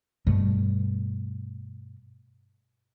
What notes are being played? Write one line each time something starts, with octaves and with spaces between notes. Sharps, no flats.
G2 B2 G3 A3